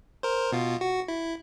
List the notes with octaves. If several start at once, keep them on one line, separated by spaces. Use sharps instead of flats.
A#4 C5
B2 F4
F#4
E4